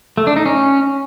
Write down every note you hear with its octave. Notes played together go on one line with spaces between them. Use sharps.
A3
D4
D#4
C#4